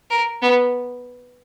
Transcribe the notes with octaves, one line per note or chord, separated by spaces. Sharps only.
A#4
B3